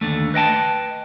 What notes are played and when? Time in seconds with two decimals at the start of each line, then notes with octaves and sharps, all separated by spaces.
0.01 D#2 D3 A3
0.34 B4 D#5 G5 A5